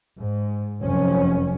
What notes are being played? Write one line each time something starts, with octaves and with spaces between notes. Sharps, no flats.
G#2
F1 F#2 F3 C#4